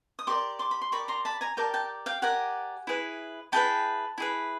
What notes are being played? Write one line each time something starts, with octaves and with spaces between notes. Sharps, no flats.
D#6
G4 A#4 D5 C6 D6
C6 D6
B5
C6
G4 A#4 D5 B5 C#6
A#5 C6
A5 B5
G#5 A#5
G4 A#4 D5 G5 A5
G5 A5
F5 G5
G4 A#4 D5 F#5 G#5
E4 G#4 B4
E4 G#4 B4 G5 A5
E4 G#4 B4